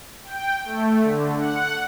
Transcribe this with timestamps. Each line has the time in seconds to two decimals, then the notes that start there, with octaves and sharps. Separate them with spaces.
0.24 G5
0.65 A3
1.02 D3
1.38 F#5